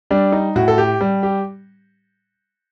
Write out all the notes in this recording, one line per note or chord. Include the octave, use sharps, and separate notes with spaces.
G3 D4
D#4
A2 F#4
A4
G4
G3
G4